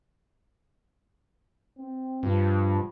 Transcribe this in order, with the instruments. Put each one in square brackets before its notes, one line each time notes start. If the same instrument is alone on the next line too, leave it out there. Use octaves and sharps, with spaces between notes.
[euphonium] C4
[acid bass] G2 [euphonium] F3